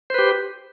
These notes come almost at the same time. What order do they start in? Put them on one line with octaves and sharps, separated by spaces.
C5 B4 G4